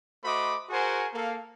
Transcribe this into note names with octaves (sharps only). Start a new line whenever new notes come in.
A3 F#4 C5 D#5 B5 D6
F#4 G#4 A#4 C5 F#5 G#5
A#3 A4 F5